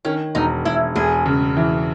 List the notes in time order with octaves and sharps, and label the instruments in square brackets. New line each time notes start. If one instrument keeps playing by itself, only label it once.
[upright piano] D#3 [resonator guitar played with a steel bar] C#4
[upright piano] E1 [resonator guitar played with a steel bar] D#4
[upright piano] E1 [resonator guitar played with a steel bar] E4
[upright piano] E1 [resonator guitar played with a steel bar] G#4
[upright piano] C#3
E3